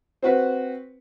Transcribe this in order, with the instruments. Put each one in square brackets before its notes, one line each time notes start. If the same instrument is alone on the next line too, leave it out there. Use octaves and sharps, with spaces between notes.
[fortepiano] C4 F#4 B4